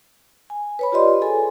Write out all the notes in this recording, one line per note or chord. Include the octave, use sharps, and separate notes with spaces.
G#5
B4 C#5 B5
F4 G4 D5 D#5 C6
G#4 A4 G#5